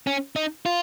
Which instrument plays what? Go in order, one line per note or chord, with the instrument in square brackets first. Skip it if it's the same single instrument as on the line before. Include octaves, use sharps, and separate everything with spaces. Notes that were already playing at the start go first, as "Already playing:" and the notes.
[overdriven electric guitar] C#4
D#4
F4